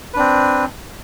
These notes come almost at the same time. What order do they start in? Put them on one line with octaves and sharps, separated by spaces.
B4 D4 C4